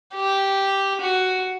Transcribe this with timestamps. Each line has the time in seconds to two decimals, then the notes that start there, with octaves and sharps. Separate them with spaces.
0.14 G4
1.01 F#4